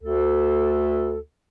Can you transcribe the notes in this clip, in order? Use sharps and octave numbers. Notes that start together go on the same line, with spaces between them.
D2 A4